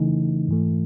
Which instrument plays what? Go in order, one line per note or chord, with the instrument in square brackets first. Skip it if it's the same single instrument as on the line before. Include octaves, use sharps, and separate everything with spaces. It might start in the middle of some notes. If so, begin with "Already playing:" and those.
Already playing: [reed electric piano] C#3 E3 A3 D#4
G#2 E3 A3